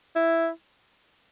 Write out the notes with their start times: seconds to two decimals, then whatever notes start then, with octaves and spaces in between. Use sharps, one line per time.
0.16 E4